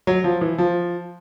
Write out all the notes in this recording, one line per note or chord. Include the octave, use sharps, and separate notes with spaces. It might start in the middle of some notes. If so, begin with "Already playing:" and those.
F#3
F3
E3
F3